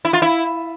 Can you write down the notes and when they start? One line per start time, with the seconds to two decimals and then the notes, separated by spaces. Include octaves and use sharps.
0.05 E4
0.13 F4
0.22 E4